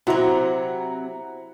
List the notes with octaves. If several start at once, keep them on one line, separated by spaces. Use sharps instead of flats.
C3 F#3 E4 F#4 F#5 A#5